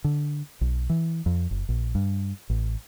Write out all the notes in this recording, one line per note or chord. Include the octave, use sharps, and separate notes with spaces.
D3
B1
E3
F2
F#1
A#1
G2
A1